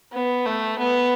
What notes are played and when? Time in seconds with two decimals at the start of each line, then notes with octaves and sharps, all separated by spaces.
0.13 B3
0.46 A3
0.79 B3